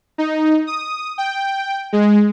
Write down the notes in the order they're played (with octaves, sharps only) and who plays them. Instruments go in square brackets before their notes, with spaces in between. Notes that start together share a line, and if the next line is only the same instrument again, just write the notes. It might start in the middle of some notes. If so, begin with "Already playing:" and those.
[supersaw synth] D#4
D#6
G5
G#3